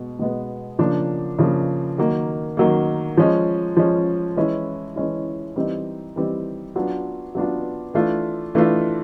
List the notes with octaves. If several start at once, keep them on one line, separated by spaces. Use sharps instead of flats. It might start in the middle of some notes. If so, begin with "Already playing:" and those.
Already playing: B2 G#3
B2 G#3 B3
C#3 F3 A#3 D4
C#3 F3 A#3 D4
D#3 F#3 A#3
D#3 F#3 A#3
F3 G#3 C#4
F3 G#3 C#4
E3 G#3 C#4 E4
E3 G#3 C#4 E4
E3 G3 C4 D#4
E3 G3 C4 D#4
F#3 B3 D4 F4
F#3 B3 D4 F4
E3 A3 D4 F4
E3 A3 D4 F4